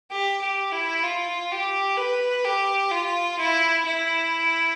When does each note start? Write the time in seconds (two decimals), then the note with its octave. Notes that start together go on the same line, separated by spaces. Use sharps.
0.10 G4
0.41 G4
0.72 E4
1.04 F4
1.51 G4
1.97 B4
2.44 G4
2.92 F4
3.39 E4
3.85 E4